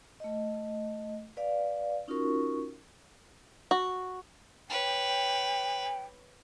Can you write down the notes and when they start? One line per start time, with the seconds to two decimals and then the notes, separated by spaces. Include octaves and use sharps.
0.20 A3 D#5
1.37 B4 D5 F5
2.08 C#4 D#4 F4 F#4 A#4 C#6
3.71 F#4
4.70 B4 C#5 G5